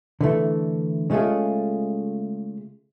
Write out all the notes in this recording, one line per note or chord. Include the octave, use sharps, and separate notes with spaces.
D3 E3 A3
C#3 G#3 A3 F4 G#4